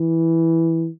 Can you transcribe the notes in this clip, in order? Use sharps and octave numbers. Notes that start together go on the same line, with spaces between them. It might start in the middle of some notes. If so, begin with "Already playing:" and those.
Already playing: E3